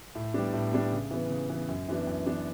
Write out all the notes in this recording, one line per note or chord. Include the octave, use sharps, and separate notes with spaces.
A2
G3 B3 D4
A2
G3 B3 D4
C#3
E3 B3
C#3
E3 B3
F#2
E3 B3 D4
F#2
E3 B3 D4